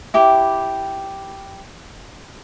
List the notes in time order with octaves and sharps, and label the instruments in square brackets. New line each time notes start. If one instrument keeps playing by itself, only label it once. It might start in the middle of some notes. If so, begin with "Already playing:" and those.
[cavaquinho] E4 G4 G5 D6